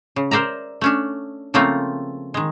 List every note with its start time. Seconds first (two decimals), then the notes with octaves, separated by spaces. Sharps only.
0.16 C#3
0.31 A#4 C5 D5 E5 A#5
0.81 A3 C#4 D4
1.54 C#3 F3 A3 A#3 C4 F4
2.34 D#3 G#3